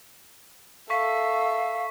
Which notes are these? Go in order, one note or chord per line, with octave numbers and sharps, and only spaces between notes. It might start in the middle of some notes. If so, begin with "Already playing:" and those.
A4 E5 F5 C#6 B6